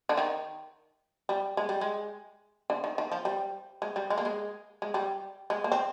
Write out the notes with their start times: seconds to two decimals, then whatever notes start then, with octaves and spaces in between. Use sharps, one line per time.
0.09 D3
0.17 D#3
1.29 G3
1.57 G#3
1.69 G3
1.81 G#3
2.70 D3
2.84 D#3
2.98 D#3
3.12 F3
3.25 G3
3.82 G#3
3.96 G3
4.10 G#3
4.18 A#3
4.25 G#3
4.82 G#3
4.94 G3
5.50 G#3
5.64 A#3
5.72 C4